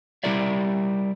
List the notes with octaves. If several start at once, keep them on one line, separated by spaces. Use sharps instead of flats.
G3 E4 G4 A#4 D5 E5